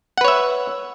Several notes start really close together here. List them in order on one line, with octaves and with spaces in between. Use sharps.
F#5 B4 C#5 E5